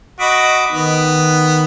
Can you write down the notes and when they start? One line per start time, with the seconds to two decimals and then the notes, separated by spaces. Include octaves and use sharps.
0.20 F#4 D#5 B5 D6
0.72 D#3 B3